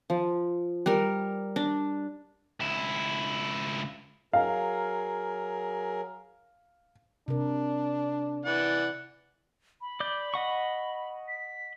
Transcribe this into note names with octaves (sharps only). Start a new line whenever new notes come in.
F3
G3 A#4
D4
C#2 E4
F#3 G#4 A#4 F5
C3 D4 A#4
E3 D5 F#5
B5
D5 G6
D#5 F#5 C#6
B6